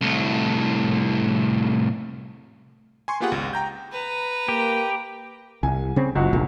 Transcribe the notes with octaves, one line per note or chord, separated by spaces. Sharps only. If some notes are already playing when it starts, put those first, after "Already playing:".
C2 A2
G#5 C6 C#6
A#3 B3 F4 G4 G#4 F#5
G#1 C#2
G5 A#5 G6
B4 A#5
A#3 G4
C2 G#5
C#3 C4
F#1 C#2 F#4
F1 A#1